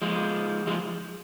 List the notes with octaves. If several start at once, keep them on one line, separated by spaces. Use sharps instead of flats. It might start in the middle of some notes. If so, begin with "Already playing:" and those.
F3 G#3
F3 G#3